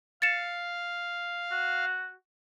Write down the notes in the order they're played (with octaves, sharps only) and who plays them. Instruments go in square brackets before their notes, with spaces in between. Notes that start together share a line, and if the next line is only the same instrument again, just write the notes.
[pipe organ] F5 [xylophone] A6 C#7 E7
[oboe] F#4